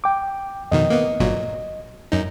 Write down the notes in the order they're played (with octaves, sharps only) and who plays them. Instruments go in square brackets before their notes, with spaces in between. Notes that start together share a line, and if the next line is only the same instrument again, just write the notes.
[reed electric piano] G5 D6
[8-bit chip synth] F2 B2 D#3 [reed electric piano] D#5
[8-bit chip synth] A#3 B3
G1 A#2 F#3
F#2 D#4